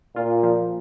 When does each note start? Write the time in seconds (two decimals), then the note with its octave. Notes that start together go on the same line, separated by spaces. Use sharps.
0.16 A#2 F4
0.43 F3